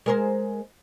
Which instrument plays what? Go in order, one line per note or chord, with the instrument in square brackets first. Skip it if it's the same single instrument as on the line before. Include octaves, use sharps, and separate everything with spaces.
[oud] G#3 A#4 C5